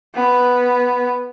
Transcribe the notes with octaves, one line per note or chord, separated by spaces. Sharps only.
B3